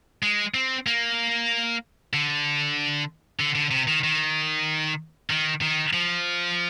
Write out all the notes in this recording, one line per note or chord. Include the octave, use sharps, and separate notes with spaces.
G#3
C4
A#3
D3
D3
D3
C3
D#3
D#3
D#3
D#3
F3